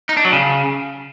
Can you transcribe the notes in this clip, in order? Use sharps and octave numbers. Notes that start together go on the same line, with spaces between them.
D#4
D4
F#3
C#3